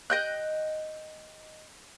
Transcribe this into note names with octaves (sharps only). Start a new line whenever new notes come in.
D#5 G5 F#6